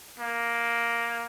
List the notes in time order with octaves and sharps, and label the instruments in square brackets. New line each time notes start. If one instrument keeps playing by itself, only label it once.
[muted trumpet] A#3